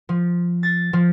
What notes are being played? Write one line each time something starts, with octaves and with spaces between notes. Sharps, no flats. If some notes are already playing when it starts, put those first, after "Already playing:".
F3
A6
F3